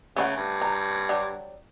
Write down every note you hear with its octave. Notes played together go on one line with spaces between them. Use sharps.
C#3 A3 C#5 F#5
G2
A#5
D3 F#3 G3